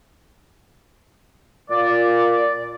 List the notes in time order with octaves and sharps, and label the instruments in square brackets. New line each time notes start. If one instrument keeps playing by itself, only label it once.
[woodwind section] A#2 D5